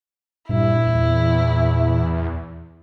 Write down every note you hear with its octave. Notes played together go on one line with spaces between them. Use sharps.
G2 A#2 E4
E2